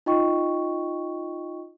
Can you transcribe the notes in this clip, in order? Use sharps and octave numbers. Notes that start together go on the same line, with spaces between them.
D#4 F4 D#5 G5 C#6